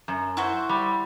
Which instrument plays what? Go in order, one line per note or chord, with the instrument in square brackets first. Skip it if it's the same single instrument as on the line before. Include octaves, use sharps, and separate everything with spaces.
[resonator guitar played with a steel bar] F#2
[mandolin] E4 F#4 C5
[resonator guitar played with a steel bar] G3